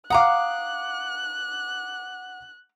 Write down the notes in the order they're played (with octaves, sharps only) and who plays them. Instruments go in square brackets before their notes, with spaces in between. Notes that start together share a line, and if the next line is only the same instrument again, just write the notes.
[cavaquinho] F5 A#5 D#6 [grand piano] F#5 D6 [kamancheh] F#6